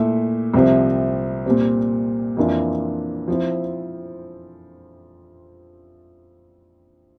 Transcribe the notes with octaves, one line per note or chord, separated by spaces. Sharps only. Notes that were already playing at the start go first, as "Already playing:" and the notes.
Already playing: A#2 A3 E4 A4 E5
C2 C3 F3 C4
A#2 G3 C4
F2 E3 A#3 D4 F4
F3 C4 E4